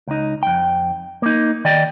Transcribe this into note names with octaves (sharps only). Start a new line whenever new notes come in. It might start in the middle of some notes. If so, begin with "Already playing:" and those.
C#2 D#4
F2 G5
A#3 D#4
D#3 D5 D#5 G5